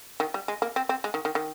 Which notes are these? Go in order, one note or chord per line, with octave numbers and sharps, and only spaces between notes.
D#3
G3
G#3
A#3
C4
C4
G#3
D#3
D#3
D#3